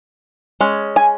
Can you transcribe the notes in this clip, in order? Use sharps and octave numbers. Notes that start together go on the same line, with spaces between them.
G#3 C#4
G#5